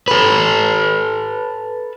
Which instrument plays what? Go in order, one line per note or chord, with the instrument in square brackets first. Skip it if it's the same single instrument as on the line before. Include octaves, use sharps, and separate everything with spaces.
[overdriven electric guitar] A4 B4